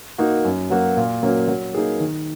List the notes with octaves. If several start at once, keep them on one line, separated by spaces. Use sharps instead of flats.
A#3 D#4 F#4
F#2
F#3 A#3 F#4
A#2
F#3 A#3 C#4 F#4
F#3
A#3 D#4 G#4
D#3